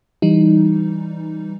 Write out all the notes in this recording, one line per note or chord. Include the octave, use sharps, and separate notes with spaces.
E3 G3 D#4